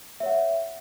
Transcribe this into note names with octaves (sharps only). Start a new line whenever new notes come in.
C#5 E5 F#5